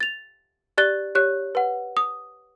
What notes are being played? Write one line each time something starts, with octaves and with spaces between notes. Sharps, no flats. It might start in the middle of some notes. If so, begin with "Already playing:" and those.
A6 F7
G4 D5 F#6 A6 G7
G4 C#5 F#6
B4 F#5
D#6